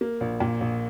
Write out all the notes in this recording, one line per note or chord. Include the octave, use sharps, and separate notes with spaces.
A#3
A#1
A#2
A#1